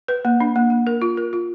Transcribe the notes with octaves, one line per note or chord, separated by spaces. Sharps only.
B4
A#3
D4
A#3
A#3
A#4
F4
A#4
F4